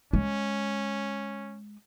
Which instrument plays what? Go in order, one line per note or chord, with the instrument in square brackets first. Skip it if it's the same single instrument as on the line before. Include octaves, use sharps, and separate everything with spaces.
[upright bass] G#3 [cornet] C#4